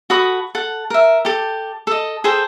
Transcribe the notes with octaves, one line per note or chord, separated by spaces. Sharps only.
F#4 A4 B5 D#6
A4 F#5
A#4 E5
G4 A4
A4 D#5
G#4 A4 C5 G5